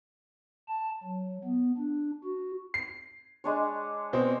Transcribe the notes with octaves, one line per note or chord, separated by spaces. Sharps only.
A5
F#3
B3
D4
F#4
C7
G#3 D4 C#5
B2 C4